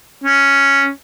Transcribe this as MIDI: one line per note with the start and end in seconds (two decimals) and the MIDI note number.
0.24 0.89 61